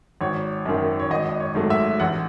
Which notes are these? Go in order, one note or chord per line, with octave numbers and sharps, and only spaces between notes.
G#1 C#5
F#2 D#3
C#5
G#1 D#5
D#5
C#5
G#2 F#3 A3
E5
A1 F#5